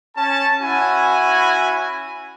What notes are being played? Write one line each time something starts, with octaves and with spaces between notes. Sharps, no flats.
C#4 A5
C#4 E4 F#4 G#5